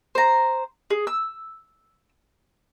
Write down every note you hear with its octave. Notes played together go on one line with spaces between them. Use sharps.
C5 A#5
G#4
E6